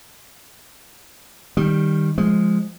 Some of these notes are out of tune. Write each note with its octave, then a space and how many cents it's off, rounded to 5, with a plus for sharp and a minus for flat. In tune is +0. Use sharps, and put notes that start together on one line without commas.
D#3 +0 G3 +0
F3 +0 G#3 +0